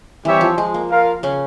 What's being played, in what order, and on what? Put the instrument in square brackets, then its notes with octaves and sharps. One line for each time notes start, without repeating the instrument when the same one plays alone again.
[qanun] E3 [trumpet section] G3 C4 G4 C#5 E5
[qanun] F3
G#3
A#3
[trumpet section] F4 A#4 F5
[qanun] C#3 C#4